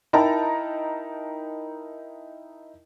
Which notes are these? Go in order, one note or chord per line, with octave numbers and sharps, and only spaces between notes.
D#4 E4 A#4 G5 A5 A#5